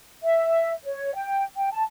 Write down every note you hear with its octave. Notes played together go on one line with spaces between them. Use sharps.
E5
C#5
G5
G5
A5